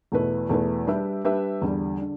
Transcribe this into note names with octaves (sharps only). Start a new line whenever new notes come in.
E2 B2 A3 E4 B4
E2 B2 A3 E4 B4
G3 D4 G4 B4 E5
G3 D4 G4 B4 E5
E2 D3 G3
D3